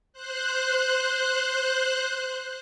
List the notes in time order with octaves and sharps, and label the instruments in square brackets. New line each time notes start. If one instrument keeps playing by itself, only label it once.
[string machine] C5 F#6